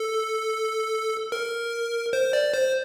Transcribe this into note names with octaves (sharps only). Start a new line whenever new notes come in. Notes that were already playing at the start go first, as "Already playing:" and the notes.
Already playing: A4
A#4
C5
D5
C5